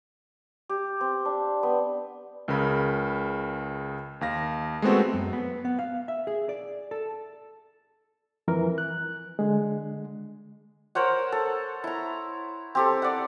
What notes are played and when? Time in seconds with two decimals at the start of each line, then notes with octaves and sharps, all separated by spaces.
0.69 G4
1.01 C4
1.25 D4
1.63 B3
2.48 C#2 C#3 A#4 B5
4.21 D#2 F5 A#6
4.82 G#3 A3 B3 C4 F#4
5.13 F#2
5.33 B3
5.65 B3
5.79 F5
6.08 E5
6.27 G#4
6.49 D5
6.91 A4
8.48 F2 E3 A#4
8.78 F#6
9.39 D3 G#3
10.95 A#4 C5 C#5 F#5
11.32 A4
11.84 E4 A#5
12.75 C4 G4 A4
13.02 D5 F#5